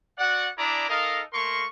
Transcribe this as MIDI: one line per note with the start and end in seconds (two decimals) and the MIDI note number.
0.19 0.49 66
0.19 0.49 74
0.19 0.49 78
0.58 0.84 62
0.58 0.84 64
0.58 0.84 68
0.58 0.84 74
0.58 0.84 82
0.89 1.22 63
0.89 1.22 69
0.89 1.22 70
0.89 1.22 75
0.89 1.22 77
1.33 1.65 57
1.33 1.65 58
1.33 1.65 70
1.33 1.65 84
1.33 1.65 85